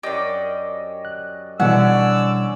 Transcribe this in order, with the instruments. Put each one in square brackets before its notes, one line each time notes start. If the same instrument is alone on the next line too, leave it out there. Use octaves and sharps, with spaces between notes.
[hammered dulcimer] F#2 D5 D#5 [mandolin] G4
[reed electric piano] F#6
[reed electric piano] B2 E3 G3 [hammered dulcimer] D3 C#4 [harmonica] D5 E6 [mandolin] F#5